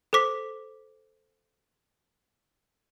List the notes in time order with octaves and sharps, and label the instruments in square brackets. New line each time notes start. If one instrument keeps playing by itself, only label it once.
[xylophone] A4 C5 D6 B6